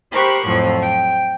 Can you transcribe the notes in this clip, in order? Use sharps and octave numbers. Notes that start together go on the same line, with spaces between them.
G4 A#4 C5 B5 C#6 F#6
F2 A2 F3 F#3
G5